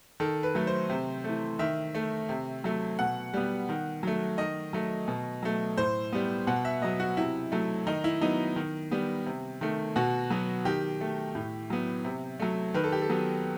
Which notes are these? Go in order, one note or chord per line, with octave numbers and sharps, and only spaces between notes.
D#3 A4
B4
F#3 A3
C5
C3
E3 A3
D#3 E5
A3
C3
F#3 A3
B2 F#5
G3 B3
D#3
F#3 A3
D#3 D#5
F#3 A3
B2
F#3 A3
A2 C5
G3 B3
B2 F#5
E5
F#3 B3 D#5
F#4
C3 E4
F#3 A3
D#3 D#4
E4
F#3 B3 D#4
D#3
G3 B3
C3
D#3 A3
B2 F#4
F#3 B3
D#3 G4
A3
A2
F#3 B3
C3
F#3 A3
D#3 B4
A4
G4
A4
F#3 B3